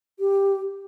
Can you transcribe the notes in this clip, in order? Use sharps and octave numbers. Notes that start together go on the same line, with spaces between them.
G4